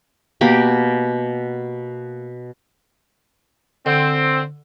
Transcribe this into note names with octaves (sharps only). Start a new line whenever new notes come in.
B2 A#3 G4 B5
D3 C4